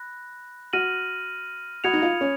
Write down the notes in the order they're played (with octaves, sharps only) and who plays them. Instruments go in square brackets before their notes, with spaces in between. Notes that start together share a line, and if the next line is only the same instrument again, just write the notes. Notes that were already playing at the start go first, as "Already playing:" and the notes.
Already playing: [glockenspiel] B5 F#6 A#6
[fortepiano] F#4 [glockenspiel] F6 A#6 D#7 F#7
[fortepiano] F#4 [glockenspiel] B5 D#6 G#6 C#7 F7
[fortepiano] D#4
F4
C#4